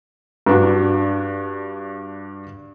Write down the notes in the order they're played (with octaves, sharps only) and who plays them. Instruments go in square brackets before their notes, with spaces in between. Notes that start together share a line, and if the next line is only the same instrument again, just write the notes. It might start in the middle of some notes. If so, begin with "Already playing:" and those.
[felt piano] G2 D4 F#4